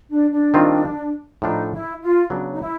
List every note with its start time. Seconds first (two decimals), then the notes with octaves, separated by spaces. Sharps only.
0.10 D4
0.32 D4
0.54 D#3 G3 C4 F4
1.42 A2 F3 A3 D4 D#4
1.72 E4
2.01 F4
2.30 C#3 F#3 B3 D4
2.53 D#4
2.59 E4